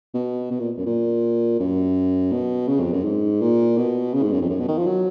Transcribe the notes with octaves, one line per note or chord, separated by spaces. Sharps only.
B2
B2
A#2
F#2
A#2
F#2
B2
C#3
F2
F#2
G#2
A#2
B2
C#3
G#2
F#2
F2
F#2
B2
D#3
F3
F#3